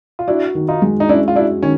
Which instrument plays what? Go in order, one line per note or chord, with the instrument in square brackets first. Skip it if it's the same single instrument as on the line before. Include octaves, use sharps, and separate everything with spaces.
[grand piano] F4
[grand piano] D4 E4 [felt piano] F#4
[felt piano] D#3
[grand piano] D#4 F4
[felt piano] G#3
[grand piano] D#4
[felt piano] C#4 [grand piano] D4 E4
[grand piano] F4
[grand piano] D4 E4 [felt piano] F#4
[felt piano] D#3 [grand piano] C#4